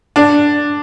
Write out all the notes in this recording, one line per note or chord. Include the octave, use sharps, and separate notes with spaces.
D4